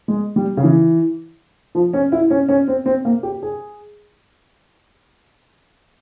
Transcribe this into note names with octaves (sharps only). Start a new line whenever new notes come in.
G#3
G3
C#3
E3
F3
C#4
E4
C#4
C#4
C4
C4
A#3
G4
G#4